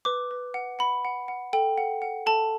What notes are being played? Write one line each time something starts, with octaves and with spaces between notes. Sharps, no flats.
B4 D6
B4
F#5
F#5 B5
F#5
F#5
A4 G5
F#5
F#5
A4 A5